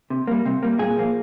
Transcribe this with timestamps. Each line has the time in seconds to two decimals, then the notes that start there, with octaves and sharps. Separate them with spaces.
0.10 C3
0.27 G3 A#3
0.46 C3
0.63 G3 A#3
0.79 A#2 G#4
0.97 F3 A#3